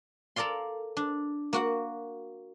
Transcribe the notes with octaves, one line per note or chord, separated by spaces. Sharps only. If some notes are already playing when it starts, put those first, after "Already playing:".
A4 A#4 D5 F5 C6
D4
A#3 F#4 F#5